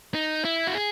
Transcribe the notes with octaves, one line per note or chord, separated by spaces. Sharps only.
D#4
E4
F#4
G#4